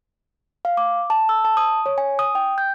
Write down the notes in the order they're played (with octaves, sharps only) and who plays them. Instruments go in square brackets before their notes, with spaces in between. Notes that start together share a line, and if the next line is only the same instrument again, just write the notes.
[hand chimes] F5
D6
A5
E6
A5
D#6
C#5
G#5
D#6
G5
G6